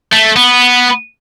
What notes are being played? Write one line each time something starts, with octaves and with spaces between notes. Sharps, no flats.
A3
B3